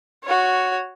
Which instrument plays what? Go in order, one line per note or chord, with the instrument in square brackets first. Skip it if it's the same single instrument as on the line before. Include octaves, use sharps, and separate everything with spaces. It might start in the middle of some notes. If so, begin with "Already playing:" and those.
[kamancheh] F#4 C#5